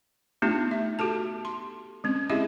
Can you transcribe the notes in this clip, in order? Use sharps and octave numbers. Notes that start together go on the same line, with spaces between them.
A3 B3 D4 D#4 F4 G4
E5
F#4 G4 A4 A5
C6
G#3 C4 C#4
C4 E4 G4 G#4 D#5 E5